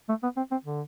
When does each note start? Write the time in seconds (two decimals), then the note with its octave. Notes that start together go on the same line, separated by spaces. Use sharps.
0.09 A3
0.23 B3
0.37 C4
0.51 C4
0.65 D3